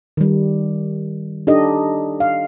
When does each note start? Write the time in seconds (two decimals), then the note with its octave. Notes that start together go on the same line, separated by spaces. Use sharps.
0.17 D#3 G3
1.47 D4 D#4 G4 A4 D#5
2.20 F5